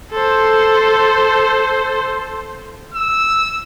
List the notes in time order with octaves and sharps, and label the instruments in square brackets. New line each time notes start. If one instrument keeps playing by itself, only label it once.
[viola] A4 C5
[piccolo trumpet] E6